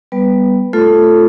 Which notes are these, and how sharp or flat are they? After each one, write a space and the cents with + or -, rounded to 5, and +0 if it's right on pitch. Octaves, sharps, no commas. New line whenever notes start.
G3 +0 B3 +0 B4 +0
A3 +0 F4 +0 A4 +0